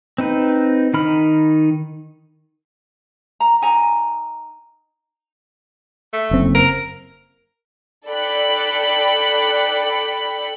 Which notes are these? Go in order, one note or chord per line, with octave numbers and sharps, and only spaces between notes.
C4 D#4 B4
D#3 D#4 B5 F6
A#5
D#4 G#5 A#5
A3
F#1 C4
A#4
A4 D5 G5 B5 F#6 C#7